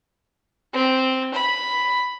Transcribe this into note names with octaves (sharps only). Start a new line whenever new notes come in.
C4
B5